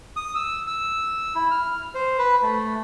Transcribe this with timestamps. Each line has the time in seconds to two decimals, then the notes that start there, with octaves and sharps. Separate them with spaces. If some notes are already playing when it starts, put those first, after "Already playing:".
0.16 D#6
0.35 E6
0.67 E6
1.35 E4
1.51 F6
1.95 C5
2.18 B4
2.42 A3